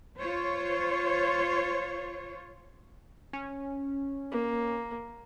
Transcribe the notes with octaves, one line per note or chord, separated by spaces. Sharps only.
F4 C5 C#5
C#4
A#3